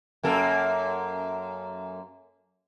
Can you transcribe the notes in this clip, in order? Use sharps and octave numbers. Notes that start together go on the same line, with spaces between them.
F#2 A#3 A4